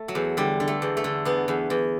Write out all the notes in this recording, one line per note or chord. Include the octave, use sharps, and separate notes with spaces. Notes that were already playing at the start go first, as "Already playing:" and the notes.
Already playing: A3
F#3
E2
D3 G3
D3
A3
E2
A3
D3
E2 B3
E2
E2